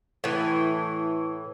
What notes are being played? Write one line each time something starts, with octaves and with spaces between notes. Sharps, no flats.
A2 E3